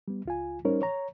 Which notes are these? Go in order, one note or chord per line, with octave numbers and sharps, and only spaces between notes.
G3 B3
C#2 F4 G#5
G3 C#4 D#4 A#4 C5 C#5
C#5 A#5